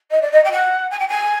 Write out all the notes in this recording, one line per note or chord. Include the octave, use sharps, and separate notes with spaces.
D#5
D5
D#5
G5
F#5
G#5
G5
G#5